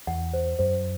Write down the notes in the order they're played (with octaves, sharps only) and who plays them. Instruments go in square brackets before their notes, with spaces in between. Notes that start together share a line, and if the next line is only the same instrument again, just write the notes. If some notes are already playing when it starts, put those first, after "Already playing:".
[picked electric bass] E2 [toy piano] F#5
[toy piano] C5
[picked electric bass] F#2 [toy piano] C5